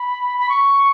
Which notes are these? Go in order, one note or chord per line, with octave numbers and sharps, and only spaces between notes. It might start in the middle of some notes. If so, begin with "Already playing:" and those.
Already playing: B5
B5
C#6